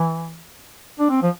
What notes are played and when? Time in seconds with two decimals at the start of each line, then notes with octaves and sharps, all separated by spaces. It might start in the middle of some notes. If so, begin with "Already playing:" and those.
Already playing: E3
0.99 D4
1.10 C4
1.23 F3